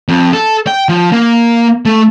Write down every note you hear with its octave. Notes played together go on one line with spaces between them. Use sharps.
F2
A4
G5
F3
A#3
A3